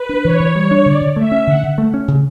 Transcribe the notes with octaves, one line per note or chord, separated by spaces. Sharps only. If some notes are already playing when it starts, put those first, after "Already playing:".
Already playing: B4
D4
E3 C#5
E3
G3
D4
D3 D5
D3
A3 E5
C#4
D3 F#5
D3
A3
C#4
C#3